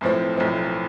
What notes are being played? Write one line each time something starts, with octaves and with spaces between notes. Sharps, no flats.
B1 A2 F3 C4
B1 A2 F3 C4